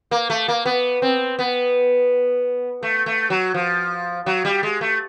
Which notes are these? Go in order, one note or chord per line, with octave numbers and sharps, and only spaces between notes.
A#3
A3
A#3
B3
C4
B3
A3
A3
F#3
F3
F#3
G3
G#3
A3